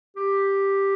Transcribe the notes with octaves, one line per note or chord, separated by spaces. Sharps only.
G4